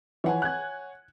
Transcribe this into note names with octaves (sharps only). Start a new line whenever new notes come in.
E3 F3 C#5 F#5 G#5
F#6 G#6